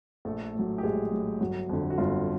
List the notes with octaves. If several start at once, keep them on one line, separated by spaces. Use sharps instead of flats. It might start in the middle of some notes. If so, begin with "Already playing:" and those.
A#1 A3 A4
A2 F#3
G4
A#1 G#3 G#4
A2 F#3
G1 F#3 F#4
F2 D3
F#4
G1 F4